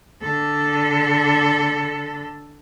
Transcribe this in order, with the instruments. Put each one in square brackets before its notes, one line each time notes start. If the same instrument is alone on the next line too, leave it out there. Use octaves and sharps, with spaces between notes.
[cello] D3 A4